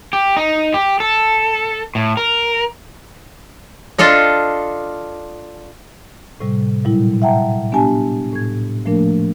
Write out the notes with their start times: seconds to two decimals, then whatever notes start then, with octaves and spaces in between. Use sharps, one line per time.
0.13 G4
0.37 D#4
0.74 G4
1.00 A4
1.95 A2
2.17 A#4
3.98 D4 F4 A4 D#5
6.40 A2 C3 G3
6.84 A#2 F#3 G3 E4
7.22 E5 F#5 G5 A5 A#5
7.72 B3 D4 G4 G#5 A5
8.32 A2 G#6
8.86 F3 A3 A#3 D4 A#4